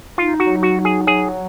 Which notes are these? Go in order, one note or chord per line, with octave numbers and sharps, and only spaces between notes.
D#4 F4
F#4
F#3
F#4
D#4
G#4
F#3 G#4